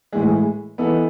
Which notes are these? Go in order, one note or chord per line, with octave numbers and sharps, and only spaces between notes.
A2 E3 G#3
E3 B3 D#4 A4